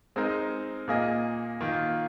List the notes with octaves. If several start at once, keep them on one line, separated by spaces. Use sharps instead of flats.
G#3 C4 D#4 A#4 D#5
A#2 A#3 G#4 D#5
D#3 A#3 F4